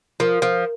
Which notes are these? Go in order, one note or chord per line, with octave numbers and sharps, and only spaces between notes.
F3 A#4
F3